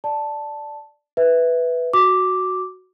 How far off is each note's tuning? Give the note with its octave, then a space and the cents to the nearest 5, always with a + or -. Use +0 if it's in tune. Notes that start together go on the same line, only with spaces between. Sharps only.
D5 +0 A5 +0
B4 +5 E5 -5
F#4 +0 D6 +0